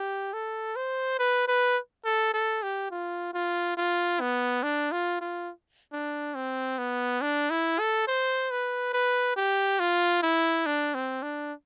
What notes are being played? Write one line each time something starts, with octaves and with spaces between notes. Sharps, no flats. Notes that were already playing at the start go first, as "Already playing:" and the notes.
Already playing: G4
A4
C5
B4
B4
A4
A4
G4
F4
F4
F4
B3
D4
F4
F4
D4
C4
B3
D4
E4
A4
C5
B4
B4
G4
F4
E4
D4
C4
D4